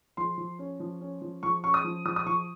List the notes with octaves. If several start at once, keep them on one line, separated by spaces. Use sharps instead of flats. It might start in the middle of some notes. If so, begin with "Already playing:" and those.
F3 C6
F3
C#4
F3
C#4
F3
F3 C#6
C#4 C#6
D#6
F3
F3 D#6
D#6
F3 C#6